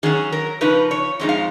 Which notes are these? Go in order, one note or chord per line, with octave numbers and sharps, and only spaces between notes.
D#3 F#3 C#4 G#4
A#4
C#3 F3 D#4 B4
C#5
F2 F3 G#3 D#4
F5